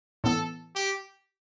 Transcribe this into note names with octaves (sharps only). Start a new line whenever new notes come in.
A2 E3 B3 A4
G4